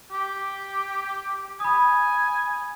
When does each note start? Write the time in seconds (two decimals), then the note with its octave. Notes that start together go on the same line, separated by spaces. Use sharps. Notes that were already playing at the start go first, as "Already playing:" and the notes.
0.11 G4
1.60 G#5 B5 D#6